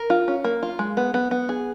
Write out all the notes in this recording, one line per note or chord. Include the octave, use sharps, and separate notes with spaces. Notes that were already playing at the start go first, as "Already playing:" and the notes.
Already playing: A#4
F4
C#4
A#3
F4
G#3
B3
B3
B3
G#4